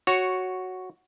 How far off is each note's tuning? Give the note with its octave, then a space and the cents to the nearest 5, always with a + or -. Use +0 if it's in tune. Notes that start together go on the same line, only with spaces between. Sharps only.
F#4 +0 C#5 -5